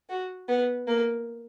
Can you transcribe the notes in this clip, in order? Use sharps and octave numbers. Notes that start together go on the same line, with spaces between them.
F#4
B3
A#3